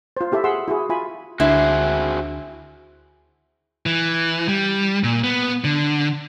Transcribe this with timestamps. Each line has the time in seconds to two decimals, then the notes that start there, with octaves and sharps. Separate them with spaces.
0.17 F4 C5
0.32 E4 G4 A4 E5
0.44 G#4 F#5 C6 E6
0.68 E4 F#4 G#4
0.89 F4 E5 G#5 B5
1.40 D2 D3 E4 F#4 G#4 C5
3.86 E3
4.48 G3
5.04 A#2
5.24 B3
5.64 D3